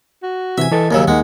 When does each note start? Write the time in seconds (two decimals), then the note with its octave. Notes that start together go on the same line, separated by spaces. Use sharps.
0.23 F#4
0.58 C3 E3 E5 G#5
0.72 E3 A4 D#5 A6
0.91 D#2 C#3 F#3 A#3 A#4 E6
1.08 D#2 G#3 A#3 D#4 F#5